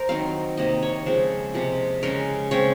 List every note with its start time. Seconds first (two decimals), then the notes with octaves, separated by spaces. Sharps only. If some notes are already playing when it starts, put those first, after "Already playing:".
Already playing: A#4 C5
0.09 D#3 F#3 C4 F5
0.57 C3 D#3 A#3 D#5
0.83 C#5
1.06 C#3 F3 G#3 C4
1.54 C3 F3 G#3
2.03 C#3 G#3 C#4 A#4
2.51 C#3 G#3 C4 C#5